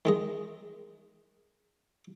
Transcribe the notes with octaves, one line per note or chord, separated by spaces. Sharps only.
D#3 G#3 D#5